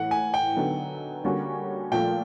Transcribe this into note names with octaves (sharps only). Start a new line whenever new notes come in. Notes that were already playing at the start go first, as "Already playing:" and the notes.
Already playing: A2 E3 A3 F#5
G#5
G5
D3 F#3 B3 D#4
D3 G3 A#3 C#4 F#4
A#2 F3 A3 G5